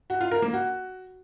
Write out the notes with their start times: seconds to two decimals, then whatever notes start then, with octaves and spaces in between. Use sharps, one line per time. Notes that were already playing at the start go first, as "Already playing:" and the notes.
0.10 F#4
0.21 F4
0.31 A#4
0.42 A#3
0.53 F#4